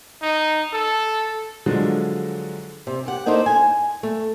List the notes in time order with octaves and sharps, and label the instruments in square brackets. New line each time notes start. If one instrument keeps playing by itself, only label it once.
[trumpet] D#4
A4
[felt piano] D3 F3 F#3 G#3 D4
[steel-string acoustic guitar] C3
G4 F#5
A#3 D#4 E4 A4 C5
G#5
A3